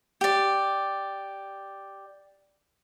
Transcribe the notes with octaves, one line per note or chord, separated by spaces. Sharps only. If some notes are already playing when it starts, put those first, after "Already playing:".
G4 D5